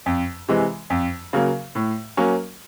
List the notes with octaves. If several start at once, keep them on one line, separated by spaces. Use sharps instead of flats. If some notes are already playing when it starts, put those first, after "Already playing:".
F2
C3 E3 G#3
F2
C#3 F#3 A#3
A2
F#3 A#3 C#4